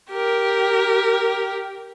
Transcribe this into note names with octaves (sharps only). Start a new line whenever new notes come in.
G4 A#4